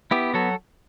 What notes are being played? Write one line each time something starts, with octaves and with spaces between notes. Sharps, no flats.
B3 E4 G4
F#3 F#4 A4